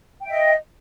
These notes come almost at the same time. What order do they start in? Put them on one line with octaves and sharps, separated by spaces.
G5 E5 D#5